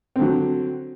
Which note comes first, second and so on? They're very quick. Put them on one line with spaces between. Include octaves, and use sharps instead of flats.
C4 D3 F#3